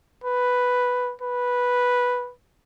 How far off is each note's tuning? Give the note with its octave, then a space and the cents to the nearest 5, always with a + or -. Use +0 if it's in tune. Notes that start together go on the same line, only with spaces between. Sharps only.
B4 +0
B4 -5